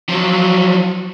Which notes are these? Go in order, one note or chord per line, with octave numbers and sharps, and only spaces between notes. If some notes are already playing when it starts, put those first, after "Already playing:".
F3 F#3